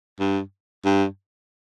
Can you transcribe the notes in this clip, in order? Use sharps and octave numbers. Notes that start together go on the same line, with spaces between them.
G2
G2